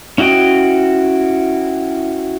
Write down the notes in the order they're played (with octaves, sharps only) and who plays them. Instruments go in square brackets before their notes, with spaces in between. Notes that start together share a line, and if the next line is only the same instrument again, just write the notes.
[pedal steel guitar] C#4 E4 F#4 D#5 G5